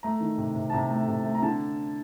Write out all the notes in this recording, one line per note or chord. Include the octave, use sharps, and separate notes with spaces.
A3 A#5
D#3
C3
C3
A5
C3 A#5
A3
C3
A3
A#5
D3 A5